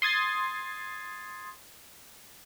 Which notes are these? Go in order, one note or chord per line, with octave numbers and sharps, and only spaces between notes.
C6 D#6 G#6 A6 C7